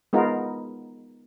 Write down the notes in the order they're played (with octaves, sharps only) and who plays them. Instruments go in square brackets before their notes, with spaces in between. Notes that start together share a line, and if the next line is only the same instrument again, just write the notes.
[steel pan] G#3 B3 D#4 F4 A#4